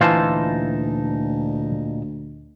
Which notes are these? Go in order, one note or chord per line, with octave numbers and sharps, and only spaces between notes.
D2 A#2 E3 D#4 F4 C5 A5